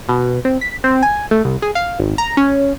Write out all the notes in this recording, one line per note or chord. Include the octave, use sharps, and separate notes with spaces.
B2
C4
B6
C4
G#5
A3
C2
G#4
F5
G#1
A#5
C#4